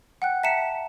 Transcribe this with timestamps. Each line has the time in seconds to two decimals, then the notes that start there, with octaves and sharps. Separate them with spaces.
0.22 F#5 G5 F#6
0.43 E5 A5 A#5 B6 C#7 E7